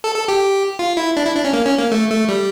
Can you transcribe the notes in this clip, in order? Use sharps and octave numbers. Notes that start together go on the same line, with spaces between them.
A4
A4
G4
F4
E4
D4
E4
D4
C#4
A#3
C#4
A#3
A3
A3
G3